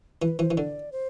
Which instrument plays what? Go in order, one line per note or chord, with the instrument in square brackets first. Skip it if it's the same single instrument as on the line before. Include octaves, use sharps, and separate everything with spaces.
[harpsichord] E3 [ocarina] B4
[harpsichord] E3 [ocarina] C5
[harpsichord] E3
[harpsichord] D3 [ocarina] D5
[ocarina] C5